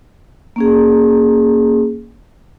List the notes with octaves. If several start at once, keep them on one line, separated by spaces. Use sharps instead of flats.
A#3 C#4 G#4